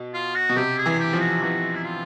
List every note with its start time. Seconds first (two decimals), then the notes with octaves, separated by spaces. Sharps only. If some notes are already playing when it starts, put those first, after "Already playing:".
Already playing: B2
0.14 F4
0.35 F#4
0.49 B2
0.56 C3 G4
0.78 G#4
0.86 E3
0.99 G4
1.13 F3
1.20 F#4
1.42 E3 F#4
1.74 E4
1.85 F4